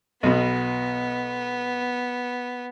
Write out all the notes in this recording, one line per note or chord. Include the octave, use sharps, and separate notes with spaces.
B1 B2 B3